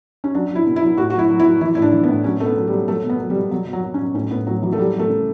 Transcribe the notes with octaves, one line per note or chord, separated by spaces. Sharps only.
C#4
F#3 D4
F#3 E4
B2
E4
F#3
A2 F#4
F#3 F#4
E4
F#3
E4
F#3
E3 E4
A2 E4
D4
E3
B3
A2
F#3 C#4
B2 A3
B3
F#3
G3
F#3
F#3 A3
B2
B3
F#3
G3
B2
B2 F#3
B2
F#3
F#3
C#4
F#3
A2 C#4
A2 B3
A2 F#3
E3 F#3
A3
F#3 G3
F#3
A3
C#3